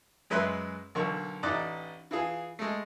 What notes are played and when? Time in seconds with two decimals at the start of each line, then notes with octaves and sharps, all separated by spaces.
0.30 F#2 G#3 B4 E5 C6 F#6
0.95 B1 D3 A#3 C#6
1.43 A1 E3 D#4 D5 D6 F#6
2.11 E3 F4 G#4
2.59 G#3 A3